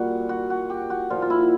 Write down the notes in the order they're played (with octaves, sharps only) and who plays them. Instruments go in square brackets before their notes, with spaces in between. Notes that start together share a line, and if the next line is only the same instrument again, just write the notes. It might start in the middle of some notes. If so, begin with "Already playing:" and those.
Already playing: [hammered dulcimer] A#2 G3 F#4
F#4
F#4
G4
F#4
A#2 F3 F4
F4
E4